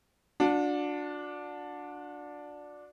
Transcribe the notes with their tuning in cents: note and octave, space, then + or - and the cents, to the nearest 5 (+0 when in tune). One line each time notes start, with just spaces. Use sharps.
D4 +0 F#4 -40